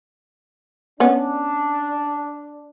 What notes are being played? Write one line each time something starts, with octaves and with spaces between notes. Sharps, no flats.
B3 C#4 D4